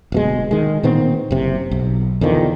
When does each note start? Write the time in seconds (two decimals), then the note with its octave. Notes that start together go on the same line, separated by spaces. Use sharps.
0.12 D1 B2 G#3
0.51 D#3 G#3
0.83 A#2 D#3 B3 C4
1.31 F#1 C3
1.71 B1
2.21 E2 D3 D#3 F3